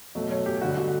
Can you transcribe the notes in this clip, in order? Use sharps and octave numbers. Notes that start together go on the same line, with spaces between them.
B2 F#3 A3
C#5
G4
G2 D3 G3 F#4
F#4